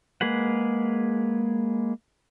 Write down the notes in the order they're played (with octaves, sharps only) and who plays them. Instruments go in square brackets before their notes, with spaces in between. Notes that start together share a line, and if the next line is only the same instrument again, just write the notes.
[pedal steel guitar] G#3 A#3 G#4 B4 F#5